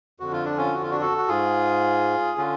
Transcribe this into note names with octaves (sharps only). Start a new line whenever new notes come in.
F2 D3 F#4
F4
D4
C#4 F4
F#4
F4
D4 F#4
F#4 A4
F#4
G#2 F4 G#4
D3 C#4 F4